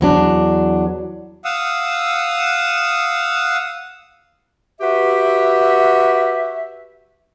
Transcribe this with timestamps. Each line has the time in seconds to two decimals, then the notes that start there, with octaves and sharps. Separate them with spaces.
0.01 E2 F#3 D4
1.45 F5 F#5 D#6 E6
4.80 F#4 G4 B4 E5